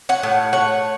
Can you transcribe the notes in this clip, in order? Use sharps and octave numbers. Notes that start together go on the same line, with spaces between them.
C#5 F#5
A2
A3 C#5 F#5